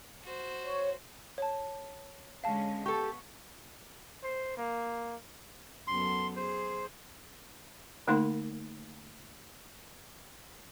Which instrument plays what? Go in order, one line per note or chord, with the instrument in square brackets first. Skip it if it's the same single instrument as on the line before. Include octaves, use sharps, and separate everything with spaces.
[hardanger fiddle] F#4 C5
[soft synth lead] C#5
[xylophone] C#5 A5
[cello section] D3 G#3 C#4 [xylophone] F5 A5
[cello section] B3 [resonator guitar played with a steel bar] G4 A4 [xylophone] C#6
[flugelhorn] C5
A#3
[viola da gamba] F#2 B3 A4 [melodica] C6
[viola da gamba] G#4 [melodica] C5
[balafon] D3 A3 A#3 D#4 A#4 C6